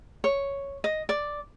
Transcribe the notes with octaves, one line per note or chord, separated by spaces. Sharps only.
C#5
D#5
D5